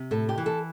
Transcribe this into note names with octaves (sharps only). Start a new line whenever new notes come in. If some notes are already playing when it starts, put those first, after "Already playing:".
Already playing: C3
A2 A4
G4
E3
A4